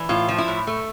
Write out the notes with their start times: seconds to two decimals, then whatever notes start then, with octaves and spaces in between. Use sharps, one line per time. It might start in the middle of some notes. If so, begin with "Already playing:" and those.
Already playing: E3
0.09 A2 F4
0.28 F3
0.38 E4
0.48 A2
0.67 A3